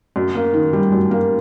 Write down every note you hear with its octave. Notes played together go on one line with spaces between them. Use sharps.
F#2
A#3
D#3
G3
F#2
A#3